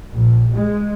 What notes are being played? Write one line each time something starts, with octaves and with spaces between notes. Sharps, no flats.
A#1
G#3